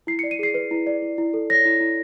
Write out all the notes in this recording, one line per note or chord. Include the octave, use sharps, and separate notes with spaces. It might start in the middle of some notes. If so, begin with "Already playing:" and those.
E4 C7
D5 C#7
D#7
G#4 C7
B4
E4
D5
E4
E4
A4
C#5 A#6
E4
E4